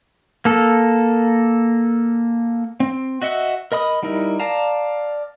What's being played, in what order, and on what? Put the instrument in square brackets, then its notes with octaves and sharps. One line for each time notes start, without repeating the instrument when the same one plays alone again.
[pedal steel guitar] A#3 A4
C4
F#4 D#5 E5 F#5
A#4 D#5 B5 D#6
G3 D#4 E4 A#4
D5 F5 A5 A#5